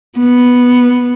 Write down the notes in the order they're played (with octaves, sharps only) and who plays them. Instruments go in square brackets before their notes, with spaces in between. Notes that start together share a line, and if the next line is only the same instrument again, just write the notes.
[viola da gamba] B3